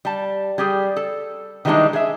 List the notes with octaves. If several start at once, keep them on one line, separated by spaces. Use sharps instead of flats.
G3 A5
G3 G4 G#4
A4
D#3 E3 G3 G#3 D4 D#4
G#4 E5